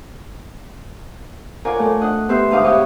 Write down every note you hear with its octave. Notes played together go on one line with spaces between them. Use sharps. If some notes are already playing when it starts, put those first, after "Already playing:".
F4 A#4 C#5 D5 F#5 G#5
A3 D5
D4 D#5 F#5
B3 G4 B4 E5 C6 G6
D2 G#2 B4 F5 D6 D#6
E4 F#4 G4 B4 C#5 D#5